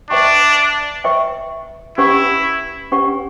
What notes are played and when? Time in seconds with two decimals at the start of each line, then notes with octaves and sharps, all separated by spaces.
0.10 D4 B4 E5 G5 C#6
1.04 B4 E5 G5 C#6
1.98 C#4 E4 G4 B4 F#5 C#6
2.92 C#4 G4 B4 F#5 C#6